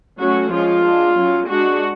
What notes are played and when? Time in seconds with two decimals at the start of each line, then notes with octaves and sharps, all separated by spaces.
0.18 F#3 A3 C#4 F#4
0.50 F3 G#3 C#4 F4
0.83 G#3 D4
1.15 F#3 C#4
1.48 G#3 D4 F#4